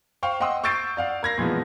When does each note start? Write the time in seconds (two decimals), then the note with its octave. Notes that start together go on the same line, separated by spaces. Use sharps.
0.23 C5 F5 G5 C#6
0.40 D#5 F#5 G5 C6 D#6 E6
0.64 C#6 E6 G6 A6 C7 D7
0.97 D5 F5 F#5
1.23 A#4 G#6 A#6 C7
1.38 A#2 E3 F3 G#3 B3